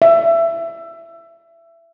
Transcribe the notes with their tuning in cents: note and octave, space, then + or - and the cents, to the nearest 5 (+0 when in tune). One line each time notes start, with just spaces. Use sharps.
E5 +20